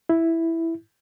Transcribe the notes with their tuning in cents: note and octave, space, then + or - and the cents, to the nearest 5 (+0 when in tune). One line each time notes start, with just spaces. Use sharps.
E4 +0